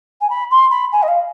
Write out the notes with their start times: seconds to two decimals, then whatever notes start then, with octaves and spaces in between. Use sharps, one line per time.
0.21 G#5
0.29 B5
0.50 C6
0.70 B5
0.92 G#5
1.02 D#5
1.07 F5